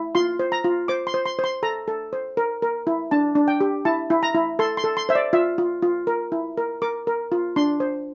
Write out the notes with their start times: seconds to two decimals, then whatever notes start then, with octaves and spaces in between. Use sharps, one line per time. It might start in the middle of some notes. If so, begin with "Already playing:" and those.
Already playing: E4
0.15 F4 C6
0.39 C5
0.52 A#5
0.64 F4
0.88 C5 D6
1.07 C6
1.14 C5
1.26 C6
1.39 C5
1.44 C6
1.63 A4 A#5
1.88 A4
2.13 C5
2.37 A#4
2.62 A#4
2.87 E4
3.11 D4 A5
3.35 D4
3.48 G5
3.61 G4
3.85 E4 A5
4.10 E4
4.23 A#5
4.35 E4
4.59 A4 C6
4.77 C6
4.84 A4
4.97 C6
5.09 C5 E5
5.15 D5
5.33 F4 E5
5.58 F4
5.82 F4
6.07 A#4
6.32 E4
6.58 A#4
6.82 A#4 D6
7.07 A#4
7.32 F4
7.56 D4 C6
7.80 C5